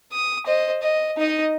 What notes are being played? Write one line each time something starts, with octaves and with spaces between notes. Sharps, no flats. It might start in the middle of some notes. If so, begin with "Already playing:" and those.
D#6
C5 D#5
D#5
D#4 D#5